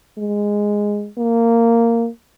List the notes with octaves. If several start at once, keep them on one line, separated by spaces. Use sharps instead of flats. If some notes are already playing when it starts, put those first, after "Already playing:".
G#3
A#3